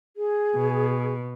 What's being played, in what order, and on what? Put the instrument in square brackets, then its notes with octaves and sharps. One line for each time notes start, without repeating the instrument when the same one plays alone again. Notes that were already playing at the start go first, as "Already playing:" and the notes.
[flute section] G#4
[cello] B2